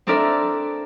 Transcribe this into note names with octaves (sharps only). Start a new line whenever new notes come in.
C4 D4 A4 A#4 D5 E5